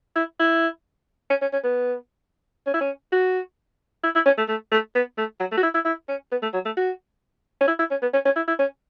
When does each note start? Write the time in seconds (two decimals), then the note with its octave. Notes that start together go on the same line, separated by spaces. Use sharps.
0.16 E4
0.40 E4
1.30 C#4
1.42 C#4
1.53 C#4
1.64 B3
2.66 C#4
2.74 E4
2.81 C#4
3.12 F#4
4.04 E4
4.15 E4
4.26 C#4
4.38 A3
4.48 A3
4.72 A3
4.95 B3
5.18 A3
5.40 F#3
5.52 A3
5.57 F#4
5.63 E4
5.74 E4
5.85 E4
6.09 C#4
6.32 B3
6.42 A3
6.54 F#3
6.65 A3
6.77 F#4
7.61 C#4
7.68 E4
7.79 E4
7.91 C#4
8.02 B3
8.13 C#4
8.25 C#4
8.36 E4
8.48 E4
8.59 C#4